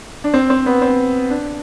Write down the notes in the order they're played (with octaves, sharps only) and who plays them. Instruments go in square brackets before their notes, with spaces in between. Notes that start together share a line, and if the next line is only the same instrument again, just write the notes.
[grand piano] D4
C4
C4
B3
C4
D4